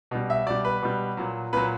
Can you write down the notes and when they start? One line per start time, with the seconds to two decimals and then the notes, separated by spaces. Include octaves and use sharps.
0.11 B2 G3
0.30 E5
0.47 B2 G3 D5
0.65 B4
0.82 B2 G3
1.17 A#2 F#3
1.53 A#2 F#3 B4